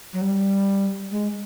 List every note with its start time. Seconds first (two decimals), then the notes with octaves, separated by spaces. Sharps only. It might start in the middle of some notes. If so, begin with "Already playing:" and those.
0.13 F#3
0.21 G3
1.11 G#3